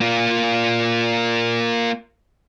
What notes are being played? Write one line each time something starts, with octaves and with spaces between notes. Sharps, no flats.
A#3 F4